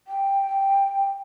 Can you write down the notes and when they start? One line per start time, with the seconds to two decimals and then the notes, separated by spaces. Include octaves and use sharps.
0.07 G5